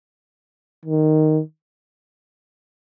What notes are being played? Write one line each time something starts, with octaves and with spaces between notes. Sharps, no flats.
D#3